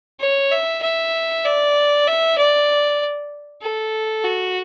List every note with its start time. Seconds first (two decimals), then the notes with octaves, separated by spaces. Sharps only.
0.20 C#5
0.51 E5
0.82 E5
1.45 D5
2.07 E5
2.38 D5
3.62 A4
4.25 F#4